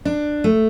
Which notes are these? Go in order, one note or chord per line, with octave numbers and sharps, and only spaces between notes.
D4
A3